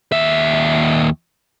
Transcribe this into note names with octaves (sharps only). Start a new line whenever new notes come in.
D#2 E5